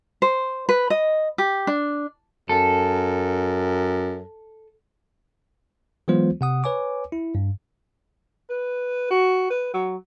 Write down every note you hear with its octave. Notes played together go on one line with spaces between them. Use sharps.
C5
B4
D#5
G4
D4
F#2 A4
E3 F#3 G#3 B3 F4 C5
C3 F#5 D#6
B4 C#5 G#5 D6
E4
G2
B4
F#4
B4
F#3